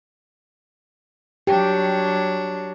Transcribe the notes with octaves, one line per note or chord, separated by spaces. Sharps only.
F#3 D4 G4 C#5